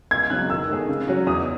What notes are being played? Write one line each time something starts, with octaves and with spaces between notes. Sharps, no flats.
C#2 G#6
C#3 F#3 F#6
D#3 E6
A3 D#4 G#4
C#3
F#3 C#4 F#4
E2 D#6